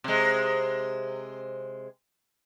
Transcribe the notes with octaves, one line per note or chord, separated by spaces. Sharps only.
C3 G#3